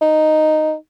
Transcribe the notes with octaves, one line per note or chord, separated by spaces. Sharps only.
D#4